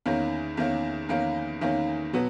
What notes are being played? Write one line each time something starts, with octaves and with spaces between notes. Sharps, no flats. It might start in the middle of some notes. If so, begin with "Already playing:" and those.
E2 D#3 A#3 C#4
E2 D#3 A#3 C#4
E2 D#3 A#3 C#4
E2 D#3 A#3 C#4
B2 F#3 B3